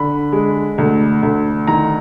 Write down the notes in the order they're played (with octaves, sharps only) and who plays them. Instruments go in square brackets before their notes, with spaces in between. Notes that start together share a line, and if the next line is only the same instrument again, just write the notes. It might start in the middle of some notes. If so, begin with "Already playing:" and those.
Already playing: [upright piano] D3 B5
G#3
D2
D2
D#3 A#5